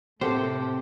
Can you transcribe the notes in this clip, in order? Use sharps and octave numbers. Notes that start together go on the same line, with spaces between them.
A2 C3 C4 G4 A4 A#4 C5 F#5